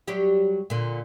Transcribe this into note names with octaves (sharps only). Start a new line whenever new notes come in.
F#3 G3 G4
A#2 D3